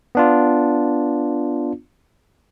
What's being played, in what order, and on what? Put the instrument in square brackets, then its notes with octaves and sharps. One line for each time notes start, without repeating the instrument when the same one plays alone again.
[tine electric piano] B3 D4 F4